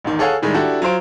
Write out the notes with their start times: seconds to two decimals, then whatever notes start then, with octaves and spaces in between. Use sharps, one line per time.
0.04 A1 E2 D#3
0.19 G#4 A4 C#5 F5 F#5 G#5
0.42 A2 D#3 G3 G#3
0.54 D4 E4 F#4 G4 A4
0.82 F#3 F4 C5 D7